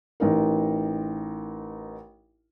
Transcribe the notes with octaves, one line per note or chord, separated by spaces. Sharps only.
A1 D#4 A#4